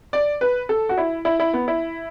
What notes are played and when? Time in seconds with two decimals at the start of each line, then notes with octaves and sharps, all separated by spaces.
0.13 D5
0.41 B4
0.69 A4
0.89 F#4
0.97 E4
1.25 E4
1.40 E4
1.53 B3
1.68 E4